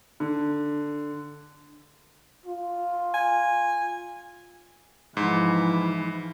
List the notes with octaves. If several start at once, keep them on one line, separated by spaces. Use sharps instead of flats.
D3
F4
G#5
G#2 E3 F3